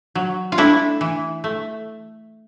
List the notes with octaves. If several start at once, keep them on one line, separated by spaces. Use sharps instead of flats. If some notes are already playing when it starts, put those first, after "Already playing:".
F#3
F4
A3 D4 E4
E3
A3